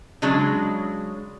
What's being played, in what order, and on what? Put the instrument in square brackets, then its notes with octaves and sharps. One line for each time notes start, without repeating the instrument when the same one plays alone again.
[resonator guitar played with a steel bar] C#3 F#3 G#3 D4